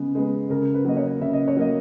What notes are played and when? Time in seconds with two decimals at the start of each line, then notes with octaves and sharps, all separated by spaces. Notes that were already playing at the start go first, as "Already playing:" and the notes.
Already playing: C#3 G#3 B3
0.15 G#3 B3
0.50 C#3 A#4
0.74 B4
0.85 F#3 A#3 D#5
0.97 C#5
1.20 C#3 E5
1.33 D#5
1.48 C#5
1.57 F#3 A#3 D#5